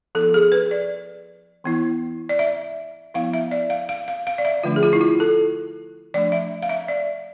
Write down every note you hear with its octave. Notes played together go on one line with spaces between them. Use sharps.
F3 B3 E4 A4
G#4
B4
D5
E3 B3 E4
D5
E5
F3 B3 E4 F5
E5
D5
F5
F5
F5
F5
D5
E5
D3 F3 A3 D4 F4
G#4
F4
E4
F4
A4
F3 A3 D4 D5
E5
F5
E5
D5